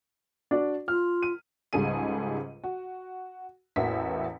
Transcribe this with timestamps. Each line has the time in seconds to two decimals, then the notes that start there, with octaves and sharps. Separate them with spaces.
0.51 D4 F#4 D5
0.88 F4 F6
1.23 D#7
1.73 C#2 G#2 G3 G#4 A4 D#7
2.64 F#4
3.76 A1 E2 A#3 F#4 E5 B6